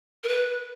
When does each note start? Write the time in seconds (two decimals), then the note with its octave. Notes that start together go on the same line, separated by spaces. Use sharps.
0.23 A#4
0.28 B4